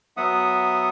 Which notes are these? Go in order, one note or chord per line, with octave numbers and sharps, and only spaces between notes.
F#3 B3 E5 F#5 D#6